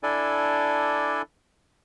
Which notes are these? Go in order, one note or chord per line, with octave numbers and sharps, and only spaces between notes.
D4 E4 A4 D5 G#5